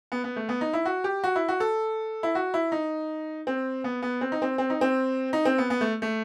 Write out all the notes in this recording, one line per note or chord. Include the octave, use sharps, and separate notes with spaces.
B3
B3
A3
B3
D#4
E4
F#4
G4
F#4
E4
F#4
A4
E4
F#4
E4
D#4
C4
B3
B3
C4
D#4
C4
C4
D#4
C4
D#4
C4
B3
B3
A3
A3